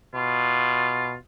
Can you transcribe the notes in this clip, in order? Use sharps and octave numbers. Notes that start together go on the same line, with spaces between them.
B2 F4